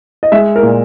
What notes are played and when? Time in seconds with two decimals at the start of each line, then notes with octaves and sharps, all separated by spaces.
0.23 D#5
0.32 G#3 E5
0.56 A#4
0.63 A#2